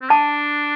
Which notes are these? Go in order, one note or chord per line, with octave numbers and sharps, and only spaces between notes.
C4
D4 A5